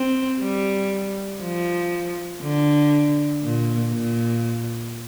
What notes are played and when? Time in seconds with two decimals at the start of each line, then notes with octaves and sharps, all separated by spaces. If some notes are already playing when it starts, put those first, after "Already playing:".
Already playing: C4
0.40 G3
1.41 F3
2.42 D3
3.43 A#2
3.93 A#2